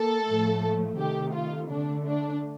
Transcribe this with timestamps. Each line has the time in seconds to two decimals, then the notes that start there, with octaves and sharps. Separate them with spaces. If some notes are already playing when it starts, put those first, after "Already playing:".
Already playing: A#3 A4
0.26 A2 F3 A3
0.98 C3 D#3 A3 G4
1.34 F4
1.70 D3 A3 D4
2.07 D4